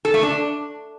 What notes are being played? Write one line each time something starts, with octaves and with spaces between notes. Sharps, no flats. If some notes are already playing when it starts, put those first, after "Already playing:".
A4
A3
D4